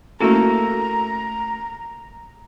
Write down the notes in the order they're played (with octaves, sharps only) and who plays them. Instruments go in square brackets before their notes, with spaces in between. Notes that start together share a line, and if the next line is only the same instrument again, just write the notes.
[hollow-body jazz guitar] A3 A#3 A4 [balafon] C#4 E4 F#4 [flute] A#5